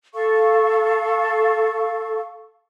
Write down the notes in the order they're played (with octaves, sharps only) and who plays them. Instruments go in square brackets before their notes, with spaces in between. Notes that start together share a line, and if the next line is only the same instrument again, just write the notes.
[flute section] A4 F5 C#6